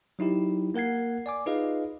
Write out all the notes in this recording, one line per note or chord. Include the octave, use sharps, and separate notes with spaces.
F#3 D#4 E4 G4
A#3 A#4 F#5 G#6 C7
D5 G#5 D6
D#4 F4 G#4 B4 D#5 F5